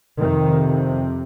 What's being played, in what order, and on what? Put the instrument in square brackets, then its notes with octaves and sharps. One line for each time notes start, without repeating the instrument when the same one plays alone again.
[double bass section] F2 C3 D#3